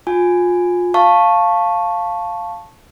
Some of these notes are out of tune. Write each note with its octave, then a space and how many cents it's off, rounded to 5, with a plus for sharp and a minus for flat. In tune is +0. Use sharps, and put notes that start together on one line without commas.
F4 +25 G#5 +0
F5 +0 A5 +0 C#6 -10